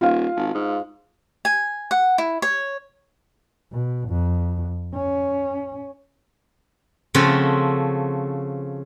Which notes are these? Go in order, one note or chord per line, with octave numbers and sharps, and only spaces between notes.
D#1 F4 F5
G#1
G#2
G#5
F#5
E4
C#5
B2
F2
C#4
C#3 F3 A3 C4 F#4 A4